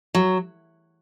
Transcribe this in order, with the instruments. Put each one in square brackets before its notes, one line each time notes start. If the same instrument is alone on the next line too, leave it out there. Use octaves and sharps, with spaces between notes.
[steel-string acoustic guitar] F#3